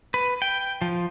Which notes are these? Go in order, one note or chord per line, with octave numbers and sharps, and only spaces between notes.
B4
G5
F3